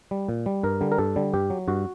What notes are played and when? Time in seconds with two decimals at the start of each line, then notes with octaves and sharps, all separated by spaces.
0.11 G3
0.29 A#2
0.46 G3
0.63 G2 A#4
0.81 D3 G3
0.92 A#4
0.98 G2 A4
1.16 D3 G3
1.33 G2 G4
1.50 F#3
1.68 G2 F#4